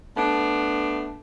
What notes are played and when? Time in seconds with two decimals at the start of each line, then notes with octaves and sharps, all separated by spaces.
0.16 A3 B3 D4